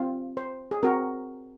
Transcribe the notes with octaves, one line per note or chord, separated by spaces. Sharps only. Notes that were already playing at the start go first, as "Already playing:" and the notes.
Already playing: C4 F4
C5
G#4
C4 F#4 A#4